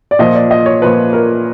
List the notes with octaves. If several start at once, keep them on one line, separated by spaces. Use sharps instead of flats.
D5
A#2 F3 D#5
D5
D#5
C#5
A#2 F3 B4
A#4